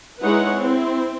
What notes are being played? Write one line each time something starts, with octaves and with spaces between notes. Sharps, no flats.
G#3 D#4 E4 B4 C#5 F#5
C4 E4